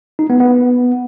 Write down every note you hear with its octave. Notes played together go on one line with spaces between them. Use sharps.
D#4
B3
B3